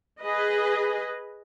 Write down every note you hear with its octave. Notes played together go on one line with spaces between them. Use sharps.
G#4 B4 D#5